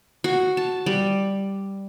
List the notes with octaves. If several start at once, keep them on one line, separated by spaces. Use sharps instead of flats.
F#4
A5
G3